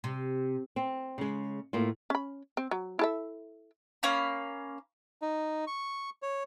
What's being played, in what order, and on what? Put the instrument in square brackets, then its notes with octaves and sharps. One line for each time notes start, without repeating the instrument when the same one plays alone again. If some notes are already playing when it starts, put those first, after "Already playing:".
[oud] C3
[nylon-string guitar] C4
C#3 G#3
A2 A#3 F4
[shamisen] C#4 B5
C4
F#3
E4 A4 E5
[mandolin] A#3 C#4 F5 B5
[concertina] D#4
C#6
C#5